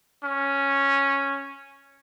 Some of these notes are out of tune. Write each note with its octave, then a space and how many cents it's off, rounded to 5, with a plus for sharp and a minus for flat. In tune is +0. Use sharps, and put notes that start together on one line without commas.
C#4 -5